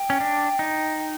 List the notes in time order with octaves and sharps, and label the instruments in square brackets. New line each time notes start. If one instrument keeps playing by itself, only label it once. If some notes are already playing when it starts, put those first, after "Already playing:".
Already playing: [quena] G5
[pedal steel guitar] C#4
D4
D#4